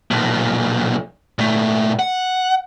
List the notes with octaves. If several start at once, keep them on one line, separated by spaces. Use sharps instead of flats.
B1 A#2
A#2 A3
F#5